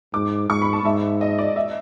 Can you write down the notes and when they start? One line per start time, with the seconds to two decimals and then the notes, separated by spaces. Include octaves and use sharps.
0.14 G#2 D6
0.50 G#2 C#6
0.62 B5
0.73 A5
0.84 G#2 E5
1.21 D#5
1.39 D5
1.56 E5